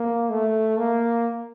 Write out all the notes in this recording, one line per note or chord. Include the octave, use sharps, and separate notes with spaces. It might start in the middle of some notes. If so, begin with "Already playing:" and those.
Already playing: A#3
A3
A#3